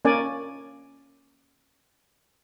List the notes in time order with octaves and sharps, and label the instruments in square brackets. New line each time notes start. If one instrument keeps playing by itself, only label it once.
[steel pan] A#3 C#4 A#4 D5 G#5